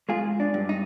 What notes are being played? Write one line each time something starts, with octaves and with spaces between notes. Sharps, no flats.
G#3 F4 G#4
D4
G2
D#4